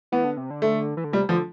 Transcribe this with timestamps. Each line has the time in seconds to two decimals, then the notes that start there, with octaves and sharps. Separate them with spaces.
0.12 E3 B3
0.24 D3
0.37 C3
0.50 D3
0.62 A3
0.97 E3
1.04 D3
1.12 C3 G3
1.29 D3 F3